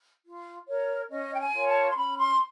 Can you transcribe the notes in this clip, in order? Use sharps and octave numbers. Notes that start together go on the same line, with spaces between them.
F4
A#4 C#5
C#4 D#5
G5
G#5
F4 A#4 C#5
A5
C6
C#4 B5
C6